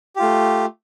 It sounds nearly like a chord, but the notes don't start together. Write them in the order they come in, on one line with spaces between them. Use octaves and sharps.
G4 F4 A3